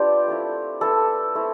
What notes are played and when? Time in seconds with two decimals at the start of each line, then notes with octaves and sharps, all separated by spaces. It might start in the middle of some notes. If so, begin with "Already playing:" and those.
Already playing: B3 D4 F4 G4
0.28 A3 C4 E4
0.81 B3 E4 A4
1.35 A3 C4 E4